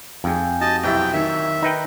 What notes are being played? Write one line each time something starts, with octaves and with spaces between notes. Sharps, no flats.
F2 G#4 G5
F#4 G4 D#5 A5
B1 C3 E4 G5
D#3 C#5 E5
D#4 B4 G5